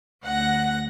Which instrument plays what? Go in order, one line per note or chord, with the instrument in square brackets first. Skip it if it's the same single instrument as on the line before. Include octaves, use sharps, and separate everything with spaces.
[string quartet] D2 A#6 [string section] F#5